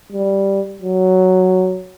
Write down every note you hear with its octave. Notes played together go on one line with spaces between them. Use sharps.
G3
F#3